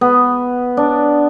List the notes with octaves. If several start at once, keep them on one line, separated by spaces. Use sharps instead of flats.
B3
D4